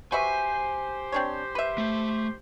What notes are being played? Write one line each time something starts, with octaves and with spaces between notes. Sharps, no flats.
F#4 G4 B4 C5 E5 G#5
C4 D4 C#5
B4 E5
A3